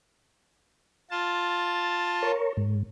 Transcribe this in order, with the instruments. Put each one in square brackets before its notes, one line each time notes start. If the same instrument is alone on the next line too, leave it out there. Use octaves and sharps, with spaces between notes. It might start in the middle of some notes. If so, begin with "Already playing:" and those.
[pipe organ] F4 A5
[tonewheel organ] A#4 C#5
G#2